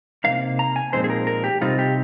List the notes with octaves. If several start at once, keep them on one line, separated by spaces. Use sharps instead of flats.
C3 G3 A#3 D#4 F5
A#5
G#5
A#2 F3 G#3 C4 D#4 C5
G#4
A#4
A#4
G4
C3 G3 C4 D#4 F4
G4